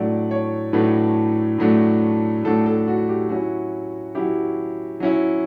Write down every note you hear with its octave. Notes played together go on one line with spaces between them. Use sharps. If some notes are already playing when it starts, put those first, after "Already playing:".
Already playing: A2 F#3 A3 D4 D5
C#5
A2 F#3 A3 D4 B4
A2 F#3 A3 D4
A2 F#3 A3 D4 A4
A4
F#4
G4
F#3 C#4 E4 F#4
F#3 C#4 E4 G4
F#3 C#4 E4